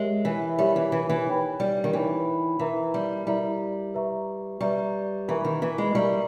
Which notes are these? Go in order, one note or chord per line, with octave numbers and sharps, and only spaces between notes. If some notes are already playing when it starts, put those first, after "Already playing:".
Already playing: G#3 G4 A#4 C#5 E5
E3
G3 G4 A#4 C#5 E5
E3
E3
E3
D#4 A#4 C#5 G5
G3
D#3
E3 D#4 A#4 C#5 G5
E3 E4 A#4 E5 A#5
G3
G3 E4 A#4 E5 A#5
B4 E5 A#5 C#6
G3 B4 E5 A#5 C#6
E3 A#4 E5 A#5 C#6
D#3
E3
G#3
G3 A#4 E5 A#5 C#6